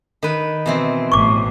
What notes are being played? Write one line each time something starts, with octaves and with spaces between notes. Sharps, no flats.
D#3 B4
B2 E3 C4
A1 A2 C#6 D6